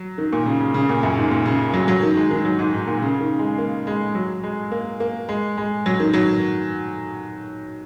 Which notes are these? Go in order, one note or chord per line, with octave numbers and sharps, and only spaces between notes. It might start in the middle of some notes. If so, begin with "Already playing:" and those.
Already playing: F#3
D#3
A#2
C#3
C#3
C#3
A#2
F#2
G#2
A#2
C#3
F#3
F#3
D#3
G#3
D#3
F#3
G#2
G#2
A#2
C#3
D#3
G#3
A#3
G#3
F#3
G#3
A#3
A#3
G#3
G#3
F#3
D#3
F#3